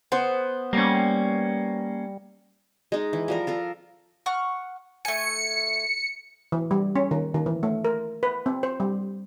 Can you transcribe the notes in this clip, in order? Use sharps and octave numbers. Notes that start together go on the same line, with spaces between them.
B3 C5
G3 A#3 C#4
G#3 D#4
E3
F3 G3 A#4
F4 A4 A#4
F#5 C#6 F6
A3 G#5 C#7
E3
G3
C#4
D#3
D#3
E3
A3
A#4
B4
C4
C5
G3